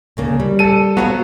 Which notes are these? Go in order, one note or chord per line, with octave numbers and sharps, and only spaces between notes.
D2 C#3 A#3
G3
A4 D#7
F#3 B3 F#4 F5 F#5